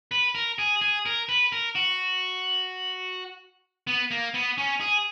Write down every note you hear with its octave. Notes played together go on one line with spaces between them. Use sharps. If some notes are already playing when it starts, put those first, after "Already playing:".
B4
A#4
G#4
G#4
A#4
B4
A#4
F#4
B3
A#3
B3
C#4
G#4